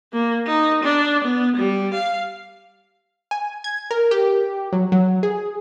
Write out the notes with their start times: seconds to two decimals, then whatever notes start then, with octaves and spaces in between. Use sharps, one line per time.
0.13 A#3
0.47 D#4
0.83 D4
1.24 B3
1.56 G3
1.94 F5
3.31 G#5
3.64 G#6
3.91 A#4
4.11 G4
4.72 F#3
4.92 F#3
5.23 G#4